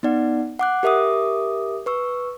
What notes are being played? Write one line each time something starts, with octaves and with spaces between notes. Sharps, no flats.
B3 D#4 D5 F#5
F#5 D6 F#6
G4 A#4 E5 D6 D#6
B4 C#6 E6